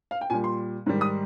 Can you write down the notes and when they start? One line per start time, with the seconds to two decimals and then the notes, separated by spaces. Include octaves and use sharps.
0.11 F5
0.21 G5
0.30 A#2 G3 G#5
0.44 C6
0.86 G#2 D#3 G3
1.01 D#6